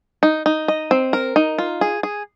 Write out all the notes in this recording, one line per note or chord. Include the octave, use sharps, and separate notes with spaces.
D#4
D#4
D#5
C4
A#4
D#4
F4
G#4
G#4